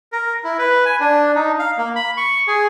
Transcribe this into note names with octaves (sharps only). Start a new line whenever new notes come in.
A#4
E4
B4
G#5
D4
D#4
F5
A#3
B5
C#6
G#4